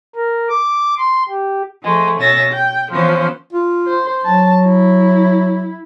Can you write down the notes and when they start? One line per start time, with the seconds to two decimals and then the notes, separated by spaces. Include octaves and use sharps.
0.15 A#4
0.49 D6
0.98 C6
1.29 G4
1.83 F3 G#3 A3
2.19 B2 C#4 E5 A6 A#6
2.50 G5
2.91 E3 F3 B3 C#4 C5
3.53 F4
3.87 C5
4.25 F#3 A5
4.66 E4